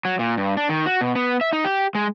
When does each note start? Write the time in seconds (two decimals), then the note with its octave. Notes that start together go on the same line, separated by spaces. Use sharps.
0.05 F#3
0.19 A#2
0.37 G2
0.57 D4
0.69 D#3
0.86 F#4
1.01 B2
1.15 B3
1.41 E5
1.53 D#4
1.65 G4
1.95 G#3